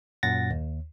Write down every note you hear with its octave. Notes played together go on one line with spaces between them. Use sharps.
F#2 A#2 F#3 F#5 A6 A#6
D#2